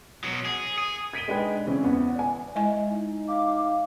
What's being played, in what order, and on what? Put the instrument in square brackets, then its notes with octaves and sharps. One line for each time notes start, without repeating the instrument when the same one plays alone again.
[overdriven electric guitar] B2 F#3
G#4
G#4
[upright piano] G#6 B6 D7 D#7 G7
G#3 D4 D#4 G#4 B4 G5
C#3 E3 C4 C#4
E2 B3
D5 G#5
[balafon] G#3 D#5 G#5 [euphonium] E4
[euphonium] D#4
[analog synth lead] F5 [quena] D6